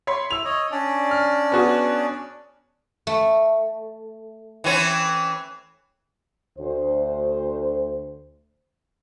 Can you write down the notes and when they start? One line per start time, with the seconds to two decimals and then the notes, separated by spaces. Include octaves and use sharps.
0.07 C#5 B5 C6
0.31 E4 E6 F7
0.44 C#5 D#5
0.71 C#4 D4 D5
1.11 F6
1.52 B3 F#4 G#4
3.07 A3
4.64 E3 C4 C#4
6.59 D2 C5